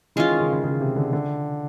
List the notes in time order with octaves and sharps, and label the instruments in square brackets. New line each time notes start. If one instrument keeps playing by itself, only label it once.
[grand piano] E3 [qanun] G#3 C#4 F4
[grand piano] D#3
C#3
C#3
C#3
C3
D3
D3